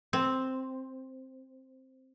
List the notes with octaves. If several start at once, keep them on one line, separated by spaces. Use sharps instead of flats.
C4